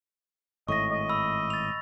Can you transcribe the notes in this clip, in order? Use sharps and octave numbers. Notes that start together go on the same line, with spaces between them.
G#1 A2 D#5 C#6 A#6
D#5
B5 E6
A6 F7